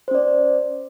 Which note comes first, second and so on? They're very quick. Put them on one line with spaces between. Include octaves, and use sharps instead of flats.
C5 C#4 D5